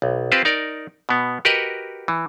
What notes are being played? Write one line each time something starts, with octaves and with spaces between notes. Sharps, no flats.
B1
C4 F4 G4 B4 C5
D#4 A#4 D5
B2 B3
F#4 G4 A#4 B4 D#5 F#5
E3